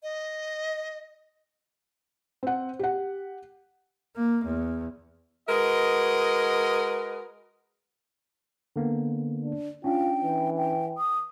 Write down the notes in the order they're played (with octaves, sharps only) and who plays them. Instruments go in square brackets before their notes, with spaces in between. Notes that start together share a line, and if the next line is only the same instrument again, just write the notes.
[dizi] D#5
[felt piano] C4 F#5
G4 F#5
[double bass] A#3
E2
[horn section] G#3 F#4 A#4 B4 D#5
[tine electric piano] D3 A#3 B3
[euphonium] D4
[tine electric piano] C#4 D4 [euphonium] F4 [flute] G5
[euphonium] E3
[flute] G5
D#6